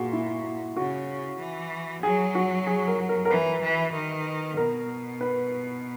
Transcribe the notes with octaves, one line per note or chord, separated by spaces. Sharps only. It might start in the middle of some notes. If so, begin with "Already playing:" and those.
Already playing: A#2 F#4 G#4
E4
C#3 F#4
E3
F#3 G#4
F#4
G#4
A#4
A#4
A#4
E3 B4
E3
D#3
B2 A#4
B4